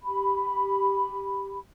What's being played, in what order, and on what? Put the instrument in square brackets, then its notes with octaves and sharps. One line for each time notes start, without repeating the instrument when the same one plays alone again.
[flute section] G4 B5